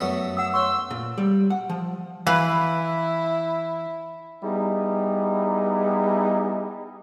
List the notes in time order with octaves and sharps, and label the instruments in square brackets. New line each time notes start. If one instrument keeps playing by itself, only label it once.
[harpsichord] F#2 A3 B3
[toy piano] F#5 D#6 [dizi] E6
[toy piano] C#5 C#6 [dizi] C6 [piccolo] E6
[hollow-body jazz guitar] A#2
G3
F#5
F3
[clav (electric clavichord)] E3 [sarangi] E4 [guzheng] B4 [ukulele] F5
[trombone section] G3 B3 D#4 E4 G#4